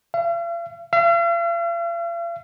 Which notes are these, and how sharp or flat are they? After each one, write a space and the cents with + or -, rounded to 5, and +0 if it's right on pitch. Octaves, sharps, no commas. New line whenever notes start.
F5 -45
F5 -45